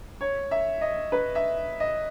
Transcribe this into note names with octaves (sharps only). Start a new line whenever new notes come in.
C#5
E5
D#5
B4
E5
D#5